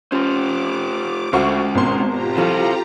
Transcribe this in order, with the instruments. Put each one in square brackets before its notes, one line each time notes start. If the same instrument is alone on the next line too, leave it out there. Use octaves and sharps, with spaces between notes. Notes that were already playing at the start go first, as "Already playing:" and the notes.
[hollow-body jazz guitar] C#4 C6 [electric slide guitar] F4 G4 C5 [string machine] D6
[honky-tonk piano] D2 F#4 C#6 [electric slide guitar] G#3 C#4 [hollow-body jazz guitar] C5
[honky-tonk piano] G#1 B2 C6
[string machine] F4 G4 A#5
[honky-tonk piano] F3 [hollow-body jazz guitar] C4 A4 F5 [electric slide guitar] E4 C5